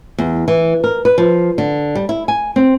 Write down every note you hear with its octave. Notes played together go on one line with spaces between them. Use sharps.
E2
E3
A#4
B4
F3
D3
G3
E4
G#5
C4